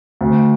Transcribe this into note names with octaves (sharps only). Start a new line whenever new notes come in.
D2